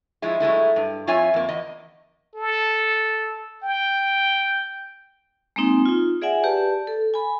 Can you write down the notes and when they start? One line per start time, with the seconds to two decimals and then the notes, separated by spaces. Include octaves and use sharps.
0.22 F3 G#3 E4
0.40 F#3 G#3 A3 E4
0.76 G2
1.07 F2 F4 C#5 E5 G#5
1.34 F2 A#3
1.49 E2 D#5
2.36 A4
3.63 G5
5.56 G#3 A#3 C4 D#4 C6
5.85 D#4 F4
6.22 G#4 D5 E5 F#5 G#5
6.43 G4 B4 D5 A5
6.87 A4
7.14 G#5 B5